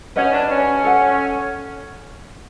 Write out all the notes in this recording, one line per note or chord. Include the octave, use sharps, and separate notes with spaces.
C#4 G4 B4 D#5 F#5
D4
C#4
A4 C#5 F#5